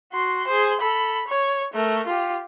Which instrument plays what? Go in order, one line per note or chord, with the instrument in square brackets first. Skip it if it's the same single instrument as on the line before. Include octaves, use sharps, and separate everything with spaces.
[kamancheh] F#4 C6
G#4 C5
A4 B5
C#5
A3 A#4
F4 G4